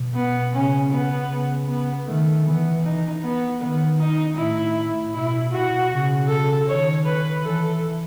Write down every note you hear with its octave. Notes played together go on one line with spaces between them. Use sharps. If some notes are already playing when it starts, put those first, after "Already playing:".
Already playing: B2
B3
C#3 C#4
B3
C#3
B3
D#3 A3
E3 B3
D#4
B3
D#3 B3
D#4
A2 E4
B2 E4
F#4
C#3
A4
D#3 C#5
B4
E3 A4